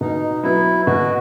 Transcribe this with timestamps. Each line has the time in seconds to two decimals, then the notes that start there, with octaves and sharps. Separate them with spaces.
0.01 B2 D#4
0.43 F#3 B3 E4
0.86 B2 F#4